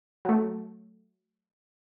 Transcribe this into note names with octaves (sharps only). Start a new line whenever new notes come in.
F#3 A3